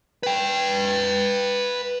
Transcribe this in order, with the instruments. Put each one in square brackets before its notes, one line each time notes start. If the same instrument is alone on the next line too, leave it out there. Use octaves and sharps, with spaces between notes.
[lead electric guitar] B4 G5